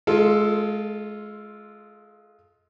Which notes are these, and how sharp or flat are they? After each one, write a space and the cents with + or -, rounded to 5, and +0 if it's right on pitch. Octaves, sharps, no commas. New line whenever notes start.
G#3 +25 F4 +0 A4 +0